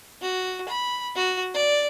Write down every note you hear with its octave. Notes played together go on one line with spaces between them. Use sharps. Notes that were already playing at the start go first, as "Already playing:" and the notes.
F#4
B5
F#4
D5